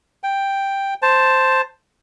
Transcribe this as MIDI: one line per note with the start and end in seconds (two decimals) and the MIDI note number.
0.23 0.94 79
1.02 1.61 72
1.02 1.61 81